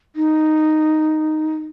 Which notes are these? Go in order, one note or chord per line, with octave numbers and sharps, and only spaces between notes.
D#4